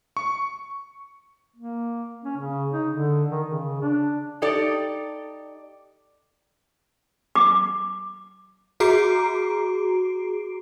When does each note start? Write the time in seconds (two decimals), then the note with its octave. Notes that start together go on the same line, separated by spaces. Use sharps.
0.17 C#6
1.56 A#3
2.24 C#4
2.37 C#3
2.73 D#4
2.90 D3
3.31 D#3
3.46 C#3
3.82 D4
4.42 D#4 G4 A4 D5
7.36 D6
8.80 F#4 G#4 A#5 D6 C7 D7